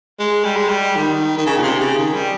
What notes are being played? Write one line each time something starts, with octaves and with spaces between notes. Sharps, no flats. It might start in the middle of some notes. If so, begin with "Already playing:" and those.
G#3
G3
G#3
G3
D#3
D#3
C#3
A#2
C3
C#3
D#3
G3